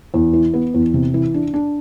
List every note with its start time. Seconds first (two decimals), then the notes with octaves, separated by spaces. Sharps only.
0.14 E2
0.33 E3
0.54 B3
0.74 E2
0.94 C3
1.14 E3
1.34 D4
1.54 D4